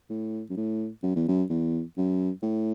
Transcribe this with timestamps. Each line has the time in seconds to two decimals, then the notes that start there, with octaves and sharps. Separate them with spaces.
0.09 A2
0.50 F#2
0.56 A2
1.03 F#2
1.16 E2
1.28 F#2
1.49 E2
1.97 F#2
2.43 A2